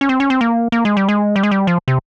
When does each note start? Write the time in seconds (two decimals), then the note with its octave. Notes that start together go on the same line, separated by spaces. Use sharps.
0.01 C#4
0.09 C4
0.20 C#4
0.30 C4
0.41 A#3
0.72 A#3
0.85 G#3
0.97 G3
1.09 G#3
1.36 G3
1.43 G#3
1.51 G3
1.67 F3
1.88 C3